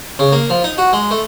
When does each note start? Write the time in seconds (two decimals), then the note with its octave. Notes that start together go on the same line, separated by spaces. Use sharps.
0.19 C#3
0.32 A#3
0.50 F3
0.64 D#4
0.78 F#4
0.93 G#3
1.11 A3